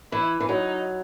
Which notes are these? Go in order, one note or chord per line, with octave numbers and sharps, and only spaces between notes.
E3 E4
E3
F#3 D#4